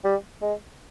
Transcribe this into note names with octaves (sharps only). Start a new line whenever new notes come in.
G3
G#3